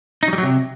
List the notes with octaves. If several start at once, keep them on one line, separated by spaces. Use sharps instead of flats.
D#4
F#3
G3
F#3
C3